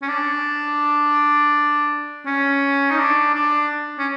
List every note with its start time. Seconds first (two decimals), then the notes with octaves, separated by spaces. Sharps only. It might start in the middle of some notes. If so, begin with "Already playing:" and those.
0.02 C#4
0.08 D4
2.26 C#4
2.90 D#4
2.98 D4
3.34 D4
3.98 C#4